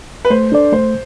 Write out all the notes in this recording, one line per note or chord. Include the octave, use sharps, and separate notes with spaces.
B4
A3 C5
D4 A4 D5
A3 C5